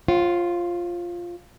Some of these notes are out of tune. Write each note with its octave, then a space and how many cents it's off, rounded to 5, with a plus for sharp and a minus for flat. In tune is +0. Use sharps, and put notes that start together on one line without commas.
F4 +0 C5 +45 F#5 +40